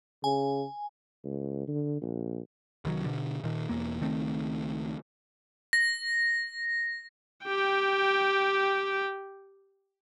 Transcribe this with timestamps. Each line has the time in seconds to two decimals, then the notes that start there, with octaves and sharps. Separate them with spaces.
0.24 C#3 G#5
1.24 C#2
1.68 D3
2.02 A#1
2.85 C2 D#3 F#3
3.04 B2 D3
3.44 A#2 D#3
3.69 E1 E2 A#3
4.01 C#2 D#3 A3 C4
5.73 A#6
7.45 G4 G5